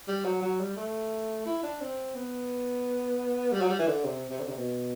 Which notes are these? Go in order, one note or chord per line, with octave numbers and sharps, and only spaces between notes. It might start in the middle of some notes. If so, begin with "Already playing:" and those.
G3
F#3
F#3
G3
A3
E4
D4
C4
B3
G3
F#3
G3
E3
D3
C3
C3
D3
C3
B2